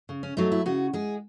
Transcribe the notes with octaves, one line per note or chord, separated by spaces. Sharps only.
C#3
C#4
F#3 A3 D#4
E4
C#3 F#4
G#3 G#4